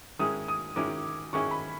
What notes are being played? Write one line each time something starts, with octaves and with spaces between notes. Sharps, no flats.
G#2 D#3 G#3 C#4 E4 D#6
D#6
G#2 D#3 G#3 C#4 E4 D6
G#2 D#3 G#3 C#4 E4 C#6
B5